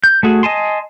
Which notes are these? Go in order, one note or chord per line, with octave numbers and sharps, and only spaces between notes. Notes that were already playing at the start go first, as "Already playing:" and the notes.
G6
A3 F#4 G#4
D#5 G#5 A5 C6